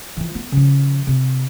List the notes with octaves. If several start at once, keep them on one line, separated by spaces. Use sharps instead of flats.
E3 F3
B3
C#3 F3
C3